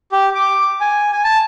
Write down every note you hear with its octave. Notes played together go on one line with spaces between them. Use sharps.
G4
D6
G#5
G#5
A5